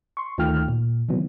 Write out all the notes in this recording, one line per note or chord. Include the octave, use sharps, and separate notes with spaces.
C6 C#6
D2 D#3 A3 F4 G5 F6
A#2
C3 D#3 E3 F#3 B3